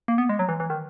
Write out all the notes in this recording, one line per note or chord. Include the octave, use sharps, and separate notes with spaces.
A#3
B3
G#3
F#3
E3
E3
D#3